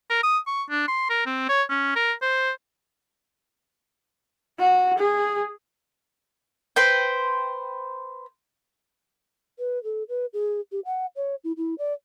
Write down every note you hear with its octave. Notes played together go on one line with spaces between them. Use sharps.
A#4
D#6
C#6
D4
C6
A#4
C4
C#5
C#4
A#4
C5
F#4
G#4
B4 C5 G5
B4
A4
B4
G#4
G4
F#5
C#5
E4
E4
D5